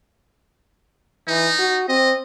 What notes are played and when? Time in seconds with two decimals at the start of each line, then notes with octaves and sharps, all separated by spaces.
1.28 E3 D#4
1.59 F#4
1.89 C4 D#5